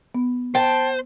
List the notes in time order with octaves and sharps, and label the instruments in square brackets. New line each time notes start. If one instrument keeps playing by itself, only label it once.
[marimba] B3
[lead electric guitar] C5 [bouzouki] G5 A5